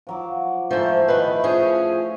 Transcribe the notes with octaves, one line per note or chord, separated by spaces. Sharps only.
F3 F#3 D6
G#2 F3 A3 E4
D#3 B4 B5
F3 C#4 G#4 A5